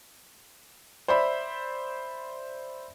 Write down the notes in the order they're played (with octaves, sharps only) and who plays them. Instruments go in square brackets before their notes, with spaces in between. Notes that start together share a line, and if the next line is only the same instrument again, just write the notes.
[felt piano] C5 D5 E5 B5